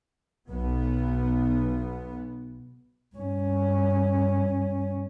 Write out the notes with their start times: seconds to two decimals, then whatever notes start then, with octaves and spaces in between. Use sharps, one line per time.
0.48 B1 B3
3.16 G2 C#4